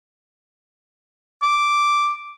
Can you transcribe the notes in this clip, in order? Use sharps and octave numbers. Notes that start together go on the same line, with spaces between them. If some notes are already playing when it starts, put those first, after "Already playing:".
D6